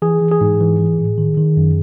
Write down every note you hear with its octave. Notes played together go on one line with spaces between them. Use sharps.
E3 G#4
E3
G#4
G#2
E3
E3
A2
D#3
D#3
F#2